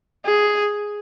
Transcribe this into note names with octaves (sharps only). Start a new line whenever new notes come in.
G#4